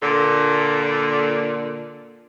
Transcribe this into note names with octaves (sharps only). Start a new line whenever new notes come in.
A#2 D3